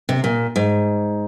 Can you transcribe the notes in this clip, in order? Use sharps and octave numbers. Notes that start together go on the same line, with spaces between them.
C3
A#2
G#2